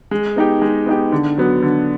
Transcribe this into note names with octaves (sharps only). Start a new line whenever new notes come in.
G#3
B3 D#4 G4
G#3
B3 D#4 G4
D3
F#3 B3
D3